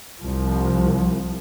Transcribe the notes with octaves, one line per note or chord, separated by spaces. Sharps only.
C2 F3